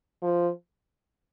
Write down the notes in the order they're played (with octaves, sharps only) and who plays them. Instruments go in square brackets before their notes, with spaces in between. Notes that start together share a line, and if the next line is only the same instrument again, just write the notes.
[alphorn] F3